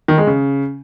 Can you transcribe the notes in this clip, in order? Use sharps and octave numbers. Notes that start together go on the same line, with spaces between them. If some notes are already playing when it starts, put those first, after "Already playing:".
D#3
G#3
C#3